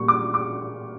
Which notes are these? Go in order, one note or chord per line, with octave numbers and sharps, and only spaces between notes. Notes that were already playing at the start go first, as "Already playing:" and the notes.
Already playing: A#2 G3 A#3 C#6
D6
D6